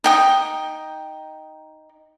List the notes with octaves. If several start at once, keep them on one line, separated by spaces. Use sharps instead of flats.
D#4 G5 D#6